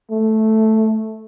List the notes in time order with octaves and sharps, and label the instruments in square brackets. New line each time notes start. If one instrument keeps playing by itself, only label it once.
[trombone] A3